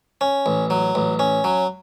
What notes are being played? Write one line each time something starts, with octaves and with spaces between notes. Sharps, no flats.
C#4
A1
F#3
A1
C#4
F#3